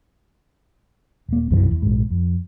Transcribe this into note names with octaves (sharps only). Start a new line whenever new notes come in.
D#1 A#3
B1 F#2 C3 E3
E2
A#1 G#2
F2